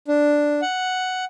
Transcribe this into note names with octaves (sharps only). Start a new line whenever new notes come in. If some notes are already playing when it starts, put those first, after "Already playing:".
D4
F#5